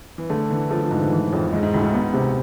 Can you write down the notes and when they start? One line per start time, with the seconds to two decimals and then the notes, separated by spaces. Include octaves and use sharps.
0.18 E3
0.30 D3 A3
0.50 D3 E3
0.70 F3 A3
0.81 F3
0.91 G#2 E3
1.01 D3
1.12 E3
1.32 F2 A2
1.52 G#2 G#3
1.63 G#2
1.74 D2 A2
1.84 G#2
1.94 B3
2.14 C3